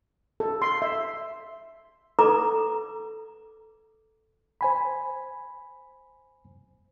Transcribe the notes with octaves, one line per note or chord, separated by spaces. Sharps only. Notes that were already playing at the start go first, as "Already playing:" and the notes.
A4
C6
E5
A4 B4 A#5 D6
C5 G#5 B5